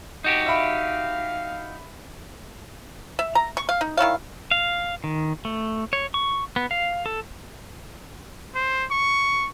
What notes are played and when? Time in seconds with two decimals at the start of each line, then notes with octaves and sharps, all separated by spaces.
0.24 D#4 F#4 G4
0.46 E5 F5 B5
3.19 E5
3.35 A#5
3.57 C#6
3.69 F5
3.81 D#4
3.97 D#3 E4 C#5 F5
4.51 F5
5.04 D#3
5.45 A3
5.93 C#5
6.14 C#6
6.56 B3
6.71 F5
7.06 A4
8.55 C5
8.91 C#6